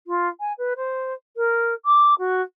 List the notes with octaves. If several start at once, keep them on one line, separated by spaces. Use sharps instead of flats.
F4
G#5
B4
C5
A#4
D6
F#4